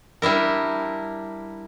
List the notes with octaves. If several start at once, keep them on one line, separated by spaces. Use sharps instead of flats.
G3 D4 E4 A#4